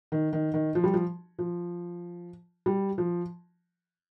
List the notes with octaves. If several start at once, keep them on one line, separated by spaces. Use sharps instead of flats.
D#3
D#3
D#3
F3
G3
F3
F3
G3
F3